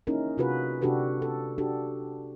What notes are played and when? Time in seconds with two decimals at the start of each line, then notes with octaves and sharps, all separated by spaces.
0.07 A#3 C#4 D#4 E4 G#4 A#4
0.37 C3 F4 F#4 G#4 B4
0.82 C3 D4 F#4 G4 A4 B4
1.22 A4
1.58 D4 F#4 G4 A4